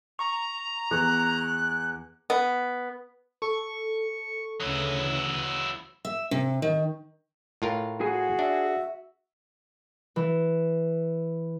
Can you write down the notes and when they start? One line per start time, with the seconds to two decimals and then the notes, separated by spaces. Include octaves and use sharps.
0.19 A#5 C#6
0.91 E2 F#6
2.30 B3
3.42 A4 C#6
4.60 D2 C#3 E3 F#3 E4 D#6
6.05 E5
6.31 C3
6.62 D#3
7.62 A2 F4 A#4
8.01 F#4 G#4 G#5
8.39 D4 E5
10.16 E3